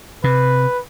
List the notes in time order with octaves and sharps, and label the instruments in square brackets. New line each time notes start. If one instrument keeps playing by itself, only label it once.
[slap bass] C3 [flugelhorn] B4